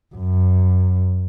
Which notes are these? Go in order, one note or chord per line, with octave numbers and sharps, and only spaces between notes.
F#2